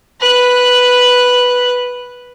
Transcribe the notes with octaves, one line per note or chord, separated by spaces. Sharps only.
B4 F#6